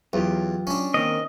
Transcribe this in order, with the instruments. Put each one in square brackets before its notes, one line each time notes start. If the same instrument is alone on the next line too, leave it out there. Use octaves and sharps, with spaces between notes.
[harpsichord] E2 [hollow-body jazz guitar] F#3 F4 G4
[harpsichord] C#4 D4
[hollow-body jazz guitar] D#3 A#3 C4 [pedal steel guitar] D#5